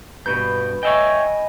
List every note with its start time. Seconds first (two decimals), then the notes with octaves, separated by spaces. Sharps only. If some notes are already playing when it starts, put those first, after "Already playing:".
0.26 G2 B2 B4 G6
0.83 C#5 D#5 E5 G5 G#5